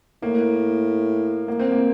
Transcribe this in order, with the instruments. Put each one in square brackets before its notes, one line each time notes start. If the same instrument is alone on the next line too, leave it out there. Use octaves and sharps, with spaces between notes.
[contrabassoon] A2 [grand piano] A#3
[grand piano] A#3
C4
A#3